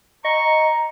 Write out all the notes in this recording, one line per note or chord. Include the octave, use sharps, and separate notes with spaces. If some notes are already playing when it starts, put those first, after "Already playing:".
D#5 A#5 C#6